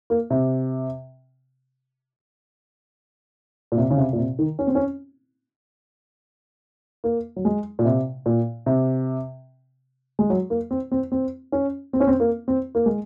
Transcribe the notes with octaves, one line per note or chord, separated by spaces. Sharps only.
A#3
C3
A#2
C3
C#3
C3
A#2
C3
D#3
C#4
C4
C#4
A#3
F#3
G#3
A#2
C3
A#2
C3
G#3
F#3
A#3
C4
C4
C4
C#4
C4
C#4
C4
A#3
C4
A#3
G#3